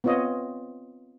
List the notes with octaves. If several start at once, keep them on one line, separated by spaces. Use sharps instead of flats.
B3 C4 F4 C#5 D#5